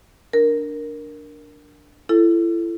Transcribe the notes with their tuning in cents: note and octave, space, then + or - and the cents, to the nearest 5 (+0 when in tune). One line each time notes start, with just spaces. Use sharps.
D4 +0 A#4 +0
E4 +35 A4 +0